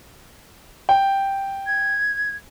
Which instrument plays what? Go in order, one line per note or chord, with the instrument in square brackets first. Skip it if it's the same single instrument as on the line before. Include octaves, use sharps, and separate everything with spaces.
[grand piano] G5
[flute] G#6